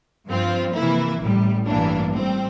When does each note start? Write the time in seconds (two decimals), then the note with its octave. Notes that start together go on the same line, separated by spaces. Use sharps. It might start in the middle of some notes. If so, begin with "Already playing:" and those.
0.27 G2 F3 C4 F4
0.74 C3 E3 A#3 E4
1.20 A1 A2 G3
1.67 A1 G2 E3 A#3 D4
2.12 A2 G3 C4